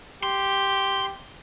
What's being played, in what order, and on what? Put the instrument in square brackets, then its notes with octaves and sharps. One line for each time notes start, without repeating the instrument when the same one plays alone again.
[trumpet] G4 [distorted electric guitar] C6